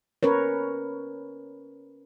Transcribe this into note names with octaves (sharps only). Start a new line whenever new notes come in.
C#4 A#4 B4 C#5